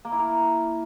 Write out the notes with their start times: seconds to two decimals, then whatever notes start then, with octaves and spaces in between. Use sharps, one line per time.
0.05 A#3
0.12 E4
0.19 A#4